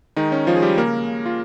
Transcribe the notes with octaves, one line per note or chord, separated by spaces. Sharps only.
D#3 G#3 D#4
C#4
F3 G#3 F4
G#4
G3 G4
C#3 A#3 A#4
C#3
F4